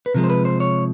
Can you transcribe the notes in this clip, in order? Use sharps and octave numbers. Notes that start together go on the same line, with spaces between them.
B4
C3 F3 G#3 A#4
C5
B4
C5
C#5